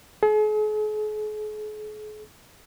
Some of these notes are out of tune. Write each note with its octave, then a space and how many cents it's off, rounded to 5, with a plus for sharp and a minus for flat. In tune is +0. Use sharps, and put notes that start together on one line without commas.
G#4 +45